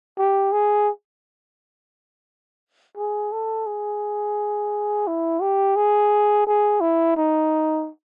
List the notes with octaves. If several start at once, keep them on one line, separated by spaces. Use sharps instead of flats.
G4
G#4
G#4
A4
G#4
E4
G4
G#4
G#4
E4
D#4